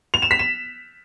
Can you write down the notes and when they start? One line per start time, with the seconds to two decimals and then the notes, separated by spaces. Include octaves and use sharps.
0.14 F7
0.22 E7
0.31 B6
0.39 E7